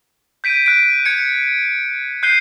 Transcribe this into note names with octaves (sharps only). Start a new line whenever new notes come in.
G6 B6 D7 D#7
F#6 B6 D7
G#6 C#7
F#6 G6 C7 D#7 G7